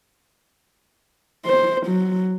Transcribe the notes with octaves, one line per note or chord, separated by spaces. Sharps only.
C5
F#3